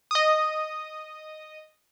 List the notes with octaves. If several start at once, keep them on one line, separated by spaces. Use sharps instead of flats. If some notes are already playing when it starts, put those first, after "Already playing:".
D#5 D#6